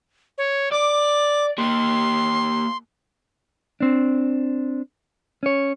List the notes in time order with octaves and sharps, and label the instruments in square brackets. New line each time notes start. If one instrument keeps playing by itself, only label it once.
[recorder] C#5
[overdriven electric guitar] D5 [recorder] D6
[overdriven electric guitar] A#3 G4 [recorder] C6
[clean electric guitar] C4 D4
C#4 C#5